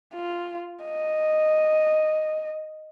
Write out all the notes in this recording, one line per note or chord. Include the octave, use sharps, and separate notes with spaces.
F4
D#5